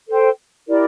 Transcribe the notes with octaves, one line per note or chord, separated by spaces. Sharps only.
A4 C5 G5
E4 G4 A#4 D5